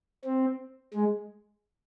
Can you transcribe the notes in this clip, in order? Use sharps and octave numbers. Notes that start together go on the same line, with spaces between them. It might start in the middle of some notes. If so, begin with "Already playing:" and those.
C4
G#3